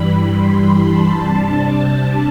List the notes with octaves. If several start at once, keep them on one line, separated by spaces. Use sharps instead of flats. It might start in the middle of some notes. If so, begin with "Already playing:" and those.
Already playing: G2 E3 G3 B5
C6
B5
A5
C3 G3 D4